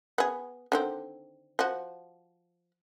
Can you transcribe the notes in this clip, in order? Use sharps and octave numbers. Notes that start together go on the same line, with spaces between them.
B3 G#4
D3 D#3 C4
F3 F#4